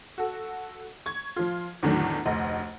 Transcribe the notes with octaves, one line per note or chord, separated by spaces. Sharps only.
F#4 A4
C#6 G#6
F3 F4
E2 A2 D3 D#3 F#3 D4
F1 D2 D#5